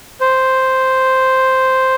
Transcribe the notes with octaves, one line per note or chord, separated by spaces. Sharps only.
C5